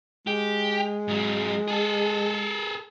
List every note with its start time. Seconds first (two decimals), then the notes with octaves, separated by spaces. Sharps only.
0.27 G#3 G4
1.08 G#2 F#3
1.68 G#4 A4